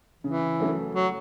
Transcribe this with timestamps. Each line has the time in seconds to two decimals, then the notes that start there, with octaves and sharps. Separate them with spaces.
0.24 C#3 E3
0.60 F#3 A3 C#4
0.95 F#3